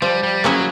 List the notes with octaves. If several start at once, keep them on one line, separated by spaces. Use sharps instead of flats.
F3 G3
G3
F#3 A#3 C#4 E4 G#4